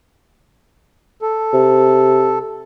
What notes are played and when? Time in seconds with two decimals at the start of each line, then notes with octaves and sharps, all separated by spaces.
1.22 A4
1.53 C3